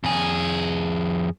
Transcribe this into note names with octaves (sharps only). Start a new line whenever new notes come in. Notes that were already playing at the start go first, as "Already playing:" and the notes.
F2 G#4